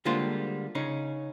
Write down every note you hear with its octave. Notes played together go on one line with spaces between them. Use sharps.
D3 G3 G#3 A#3 F4 C5
C#3 C#4 D#4